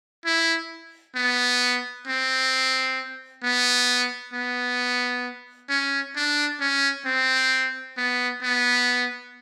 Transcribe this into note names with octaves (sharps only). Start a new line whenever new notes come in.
E4
B3
C4
B3
B3
C#4
D4
C#4
C4
B3
B3